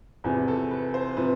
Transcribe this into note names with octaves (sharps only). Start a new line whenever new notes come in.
E2 C3 F3 B4
A4
B4
C5
C3 F3 B4